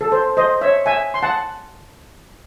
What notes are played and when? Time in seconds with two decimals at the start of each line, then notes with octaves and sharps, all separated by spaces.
0.01 A4
0.12 C5
0.37 C5 D#5
0.61 C#5 E5
0.86 E5 G#5
1.14 C6
1.23 F#5 A5